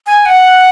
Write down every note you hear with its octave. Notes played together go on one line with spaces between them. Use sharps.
G#5
F#5